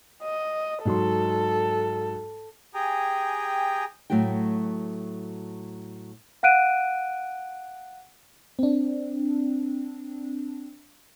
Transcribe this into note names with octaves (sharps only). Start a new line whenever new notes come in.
D#5
G#2 F#3 A4 C6
G4 G#4 G5 G#5 A#5
A2 F#3 A3 F#4 G5
F5 F#5 F#6 D7 D#7
C4 D4